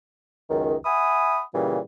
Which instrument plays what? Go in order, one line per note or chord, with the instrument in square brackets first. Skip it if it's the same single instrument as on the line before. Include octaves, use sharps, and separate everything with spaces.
[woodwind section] C#2 F#2 D#3
E5 F#5 G#5 B5 D#6
A#2 C#3 E3 G3